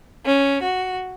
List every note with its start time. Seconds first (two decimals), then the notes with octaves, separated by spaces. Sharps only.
0.25 C#4
0.63 F#4